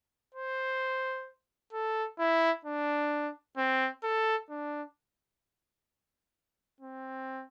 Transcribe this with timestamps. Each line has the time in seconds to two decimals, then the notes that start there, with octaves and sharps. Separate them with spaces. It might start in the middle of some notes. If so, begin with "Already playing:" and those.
0.34 C5
1.73 A4
2.19 E4
2.65 D4
3.57 C4
4.03 A4
4.50 D4
6.80 C4